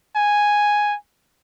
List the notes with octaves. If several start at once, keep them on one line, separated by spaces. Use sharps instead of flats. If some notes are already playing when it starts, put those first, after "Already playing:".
G#5